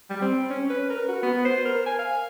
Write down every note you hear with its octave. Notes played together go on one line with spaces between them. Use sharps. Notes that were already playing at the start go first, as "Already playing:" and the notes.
G3
C4
C#4
B4
A#4
F#4
B3
C5
A#4
G#5
F5